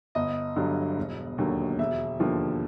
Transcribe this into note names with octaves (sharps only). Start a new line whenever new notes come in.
G1 D#5
G2 D3 F#3
E1
D#2 D3 F#3
E1 E5
D#2 D3 F3